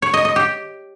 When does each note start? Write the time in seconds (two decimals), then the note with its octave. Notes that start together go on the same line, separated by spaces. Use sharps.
0.02 C#5
0.14 D#5
0.25 D#5
0.36 G4